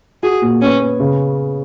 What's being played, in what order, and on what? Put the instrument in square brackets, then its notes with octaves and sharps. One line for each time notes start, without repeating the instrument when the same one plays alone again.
[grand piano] F#4 [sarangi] G#4
[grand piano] A#2
[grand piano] B3 [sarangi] C#4
[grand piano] B3
C#3